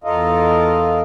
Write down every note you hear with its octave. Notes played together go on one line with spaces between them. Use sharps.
E2 F4 A4 A#4 D#5 F5